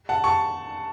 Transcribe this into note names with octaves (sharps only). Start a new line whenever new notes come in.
F#5 A5
A5 C#6